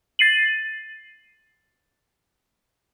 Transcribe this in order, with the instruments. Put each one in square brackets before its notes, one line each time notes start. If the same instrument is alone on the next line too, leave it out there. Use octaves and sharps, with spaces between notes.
[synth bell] A6 C7 D#7 F#7